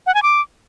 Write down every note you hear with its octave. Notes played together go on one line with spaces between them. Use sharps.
F#5
G#5
D6